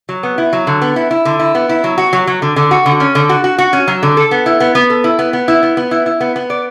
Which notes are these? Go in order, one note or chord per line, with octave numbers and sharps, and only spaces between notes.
F#3
B3
E4
F#3
D3
B3
E4
E4
D3
E4
B3
E4
F#3
F#4
F#3
F#3
D3
D3
F#4
D3
C#4
D3
F#4
F#4
F#4
C#4
F#3
D3
A4
B3
E4
B3
B3
A4
E4
B3
B3
E4
B3
B3
E4
E4
B3
B3
D5